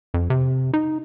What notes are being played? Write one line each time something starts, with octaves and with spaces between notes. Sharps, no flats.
F2
C3
D#4